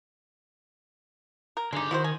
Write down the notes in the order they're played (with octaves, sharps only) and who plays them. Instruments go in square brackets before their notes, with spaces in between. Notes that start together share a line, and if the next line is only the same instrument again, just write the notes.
[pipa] A#4
[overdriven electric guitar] D3 G4 [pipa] G#3 D#4
[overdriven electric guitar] D#3 [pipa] E4 F#4 C5
[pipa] G#5